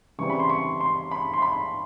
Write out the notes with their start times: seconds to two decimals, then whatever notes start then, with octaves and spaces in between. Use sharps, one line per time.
0.18 C#3 E3 G3 C4 C#6
0.30 B5
0.40 C6
0.50 C#6
0.80 C6
1.11 B5
1.33 C6
1.42 B5